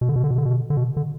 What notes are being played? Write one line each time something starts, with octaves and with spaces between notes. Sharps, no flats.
B2
D3
B2
D3
B2
D3
B2
D3
B2
D3